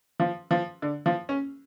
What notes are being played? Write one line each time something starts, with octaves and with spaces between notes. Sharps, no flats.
F3
F3
D3
F3
C#4